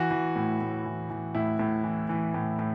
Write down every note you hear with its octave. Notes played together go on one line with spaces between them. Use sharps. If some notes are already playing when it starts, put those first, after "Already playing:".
Already playing: E3 F#4
E3
A2
A2
E3
E3
A2 E4
A2
E3
E3
A2
A2